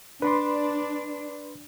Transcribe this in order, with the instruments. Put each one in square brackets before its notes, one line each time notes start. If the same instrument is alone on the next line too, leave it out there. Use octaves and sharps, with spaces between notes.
[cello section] D4 [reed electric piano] B4 B5 C6